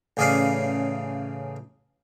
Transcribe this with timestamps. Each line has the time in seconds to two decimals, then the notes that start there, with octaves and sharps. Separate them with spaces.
0.17 A1 C#3 G#4 D5 F5